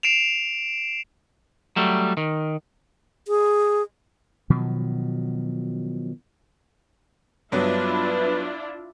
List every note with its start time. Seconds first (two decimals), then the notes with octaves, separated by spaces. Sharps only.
0.03 C7 D7 E7 F7
1.76 F#3 G3 A3
2.17 D#3
3.28 G#4
4.50 B2 D#3 F3 F#3
7.52 G2 F#3 B3 D4 E4 F4 B4